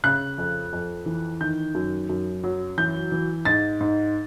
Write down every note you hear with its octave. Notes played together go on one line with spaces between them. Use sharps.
C#3 F#6
F2
F2
E3
D#3 G6
F#2
F#2
F#3
E3 G6
E3
G#2 A6
G#2